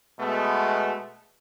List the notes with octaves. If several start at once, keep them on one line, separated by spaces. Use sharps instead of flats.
B2 G#3 A3 B3